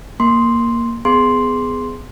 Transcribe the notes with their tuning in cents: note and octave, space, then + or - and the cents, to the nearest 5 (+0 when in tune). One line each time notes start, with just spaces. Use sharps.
A#3 +0 C6 +0
B3 +25 G#4 +0 C6 +0